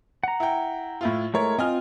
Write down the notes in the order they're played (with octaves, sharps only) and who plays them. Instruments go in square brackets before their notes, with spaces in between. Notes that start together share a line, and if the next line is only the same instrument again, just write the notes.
[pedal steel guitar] F#5 A#5
[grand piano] E4 G5
A2 E4 F4
[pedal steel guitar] G#3 A3 A#4 [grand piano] E4 C#5
[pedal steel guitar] C4 F4 [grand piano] D#5 G#5 F6